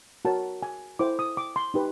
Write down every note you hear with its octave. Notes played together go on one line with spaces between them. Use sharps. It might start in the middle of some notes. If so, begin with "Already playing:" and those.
F#4 A#4 C#5 A5
G#5
E4 A4 C5 D6
D#6
D6
C6
D#4 G4 B4